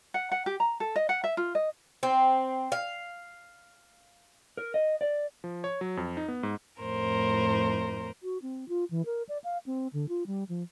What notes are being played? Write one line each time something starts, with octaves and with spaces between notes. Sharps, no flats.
F#5
F#5
G4
A#5
A4
D#5
F#5
E5
F4
D#5
C4
F5
A#4
D#5
D5
F3
C#5
F#3
F2
D#4
B3
G#2
F2 A2 A#4 C5
F#4
C4
F4
E3
A#4
D5
F5
C4
D3
F4
G3
F3